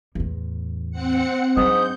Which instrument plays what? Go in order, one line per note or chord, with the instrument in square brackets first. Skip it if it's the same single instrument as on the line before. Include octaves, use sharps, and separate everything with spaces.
[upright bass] E2 A2
[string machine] C4 F#5 C#7
[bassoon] G#2 [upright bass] F#3 D4 [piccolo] D#6 [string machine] G6